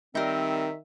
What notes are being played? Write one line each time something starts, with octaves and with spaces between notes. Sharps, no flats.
D#3 G3 C4 D#4 A#4 E5